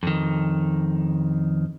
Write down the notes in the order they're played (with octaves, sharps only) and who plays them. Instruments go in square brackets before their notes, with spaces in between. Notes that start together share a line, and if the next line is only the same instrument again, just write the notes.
[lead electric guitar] F2 D#3